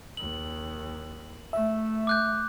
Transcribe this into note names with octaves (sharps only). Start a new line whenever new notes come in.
D#2 F#7
A3 E5
D6 F#6 G6